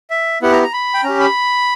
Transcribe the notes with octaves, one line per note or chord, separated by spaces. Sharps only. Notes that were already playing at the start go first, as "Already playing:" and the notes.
E5
B3 E4 G4 F#5
A#5
A#5
B5
G5
C#4 A#5
G4
B5